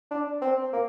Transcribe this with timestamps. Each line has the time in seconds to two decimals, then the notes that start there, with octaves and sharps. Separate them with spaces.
0.11 D4
0.41 C4
0.72 A#3